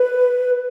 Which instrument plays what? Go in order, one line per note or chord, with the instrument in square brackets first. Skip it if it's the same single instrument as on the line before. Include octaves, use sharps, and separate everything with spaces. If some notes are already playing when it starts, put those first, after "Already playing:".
Already playing: [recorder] B4